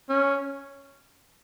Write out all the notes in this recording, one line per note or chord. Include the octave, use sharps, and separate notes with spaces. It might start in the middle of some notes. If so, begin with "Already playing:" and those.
C#4